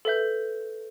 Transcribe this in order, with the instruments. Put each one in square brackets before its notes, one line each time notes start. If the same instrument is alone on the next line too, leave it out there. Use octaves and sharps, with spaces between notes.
[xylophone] A4 B4 E5 G6